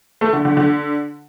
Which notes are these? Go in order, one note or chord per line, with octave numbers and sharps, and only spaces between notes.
A3
D3
D3
D3